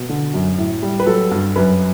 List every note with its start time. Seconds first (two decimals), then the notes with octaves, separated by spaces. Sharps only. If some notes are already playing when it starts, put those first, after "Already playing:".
Already playing: B2
0.09 D3
0.34 F#2
0.58 A2
0.82 G3
1.00 B4
1.06 F#3 A4
1.31 G2
1.56 F#2 B4